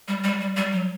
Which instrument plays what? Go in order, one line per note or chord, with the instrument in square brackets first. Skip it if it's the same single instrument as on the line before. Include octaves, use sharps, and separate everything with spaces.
[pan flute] G3
G3
G3
G3
F#3